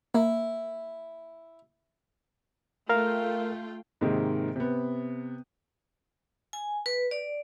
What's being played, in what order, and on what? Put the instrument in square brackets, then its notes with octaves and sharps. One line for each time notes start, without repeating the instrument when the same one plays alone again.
[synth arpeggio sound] A#3 [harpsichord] E4
[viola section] A3 F4 G5 [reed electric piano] A#4 F5 F6
[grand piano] G#2 C3 D#3 A#3
C3 B3
[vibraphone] G#5
B4
D5